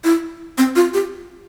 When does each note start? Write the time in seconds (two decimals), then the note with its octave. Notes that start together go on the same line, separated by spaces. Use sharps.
0.04 E4
0.58 C4
0.76 F4
0.94 G4